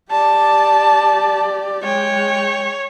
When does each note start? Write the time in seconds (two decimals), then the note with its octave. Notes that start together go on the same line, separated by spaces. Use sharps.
0.11 G4 D5 A5
1.84 G#3 C#5 G5